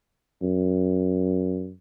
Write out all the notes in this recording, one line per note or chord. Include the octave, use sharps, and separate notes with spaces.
F#2